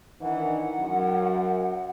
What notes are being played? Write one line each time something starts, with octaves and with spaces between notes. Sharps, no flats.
D#3 E3 D4 F#5
F#2 F#3